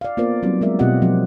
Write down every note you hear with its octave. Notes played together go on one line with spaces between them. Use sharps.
D5 F5
A#3 B3 F4 A#4 C5 D5
F#3 G3 C4 D#4
G#3 B3 A#4 D5 E5
B2 C4 F4 G4 D#5 F#5
F3 F#3 C4